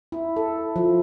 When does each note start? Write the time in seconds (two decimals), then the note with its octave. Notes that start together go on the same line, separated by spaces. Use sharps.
0.12 E4
0.36 A4
0.76 F3